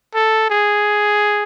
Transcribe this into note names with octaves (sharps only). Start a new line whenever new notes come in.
A4
G#4